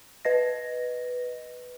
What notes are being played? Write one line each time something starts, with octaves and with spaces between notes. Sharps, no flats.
B4 D#5 A#6